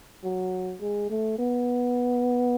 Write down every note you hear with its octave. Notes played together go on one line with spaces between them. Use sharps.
F#3
G#3
A3
B3